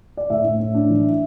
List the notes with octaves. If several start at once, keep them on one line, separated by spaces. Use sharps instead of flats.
D5
A2 E5
A2
A2
D4
E3